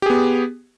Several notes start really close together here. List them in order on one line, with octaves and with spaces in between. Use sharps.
G4 G#4 B3